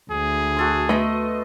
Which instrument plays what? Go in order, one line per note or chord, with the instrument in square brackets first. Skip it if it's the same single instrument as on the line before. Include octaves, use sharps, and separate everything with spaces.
[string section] D2 [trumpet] G#4
[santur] F#4 A4 C6
[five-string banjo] A3 [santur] B3 D#5 C6